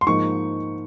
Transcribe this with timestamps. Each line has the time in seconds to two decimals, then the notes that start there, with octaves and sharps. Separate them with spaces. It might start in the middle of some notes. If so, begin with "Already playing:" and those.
0.01 C6
0.07 G#2 F3 A#3 D#4 C#6